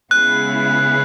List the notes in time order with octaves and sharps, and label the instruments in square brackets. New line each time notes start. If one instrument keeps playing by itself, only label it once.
[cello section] C#3 G#3 B3 E4 G#4 [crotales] F#6